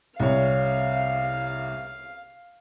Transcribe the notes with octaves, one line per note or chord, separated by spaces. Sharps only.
C2 C#5 F5